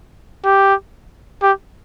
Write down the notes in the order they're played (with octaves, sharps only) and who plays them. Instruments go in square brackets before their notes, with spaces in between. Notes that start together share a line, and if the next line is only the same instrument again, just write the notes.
[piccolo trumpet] G4
G4